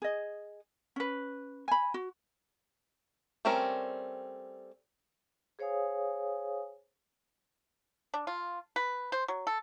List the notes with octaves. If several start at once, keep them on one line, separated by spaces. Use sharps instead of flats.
G#4 D#5
C#4 B4
G#5 B5
F#4
G3 A3 C4 C#4 A#4
G#4 C5 C#5 F5 G#5 D#6
D4
F4
B4
C5
F#3
A4